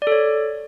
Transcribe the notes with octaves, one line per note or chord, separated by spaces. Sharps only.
D5
A4
C#5